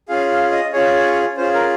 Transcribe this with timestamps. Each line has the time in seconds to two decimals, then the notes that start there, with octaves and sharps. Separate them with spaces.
0.09 C#4 F4 G#4 F5
0.31 F5
0.52 D#5
0.73 C#4 F4 G#4 C#5
1.37 C#4 F4 G#4 C5
1.54 A#4